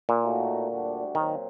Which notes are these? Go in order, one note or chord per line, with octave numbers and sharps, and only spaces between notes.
A#2
A2 A3 D#4 F#4
D2 D3 G3 D4 F#4
A#2 D#3 F#3 C4